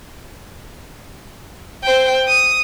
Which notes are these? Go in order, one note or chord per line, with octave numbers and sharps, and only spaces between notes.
C5 G5
D#6